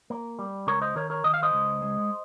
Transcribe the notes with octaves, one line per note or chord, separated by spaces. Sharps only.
A#3
G3
C#2 A#4 C#5
C5 D#5
D#3 A#4 C#5
A#4 C#5
D#3 D#5
F5
C5 D#5
C#2
G#3